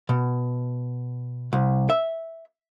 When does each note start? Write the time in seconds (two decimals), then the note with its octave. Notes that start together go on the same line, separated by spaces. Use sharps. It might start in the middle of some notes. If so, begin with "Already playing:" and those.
0.09 B2
1.53 C2
1.90 E5